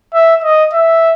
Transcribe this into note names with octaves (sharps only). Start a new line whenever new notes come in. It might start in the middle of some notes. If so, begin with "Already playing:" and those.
E5
D#5
E5